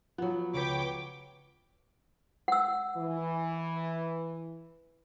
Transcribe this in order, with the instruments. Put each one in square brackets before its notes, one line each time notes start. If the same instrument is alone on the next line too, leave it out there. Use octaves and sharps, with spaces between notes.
[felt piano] F3 [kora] F#3 B3
[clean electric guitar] C#2 B4 [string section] C#5 G5 D6
[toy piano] F#5 E6
[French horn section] E3